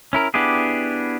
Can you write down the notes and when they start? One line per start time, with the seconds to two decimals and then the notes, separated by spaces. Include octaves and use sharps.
0.13 C#4 E4 A#4
0.34 B3 D4 E4 G4 G#4